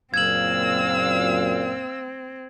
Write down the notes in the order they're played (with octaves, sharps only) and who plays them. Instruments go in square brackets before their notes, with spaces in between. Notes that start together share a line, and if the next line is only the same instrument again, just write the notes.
[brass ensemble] F#1 F#2 A#2 [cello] C4 [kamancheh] F5 E6 [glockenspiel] G#6 F#7